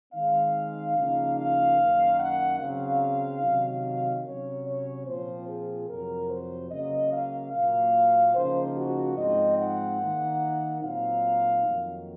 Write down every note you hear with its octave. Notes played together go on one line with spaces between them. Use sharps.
D#3 G#3 C4 D#4 F5
C#3 F3 A#3 D#4
F5
F#2 D#3 A#3
F#5
C#3 F#3 C4 D#4 F5
C3 D#3 F#3
C3 F#3 C#4 C#5
C#5
A#2 F3 C4 C5
G#4
F2 C3 F#3 A#4
C5
C#3 F#3 A#3 D#5
F5
A#2 F#3 A#3 F5
C#3 F3 A#3 D#4 C5
F#4
G#2 F3 C4 D#4 D#5
F#5
D#3 A#3 D#4
A#2 F#3 C4 D#4 F5
F2 D#3 F#3 A#3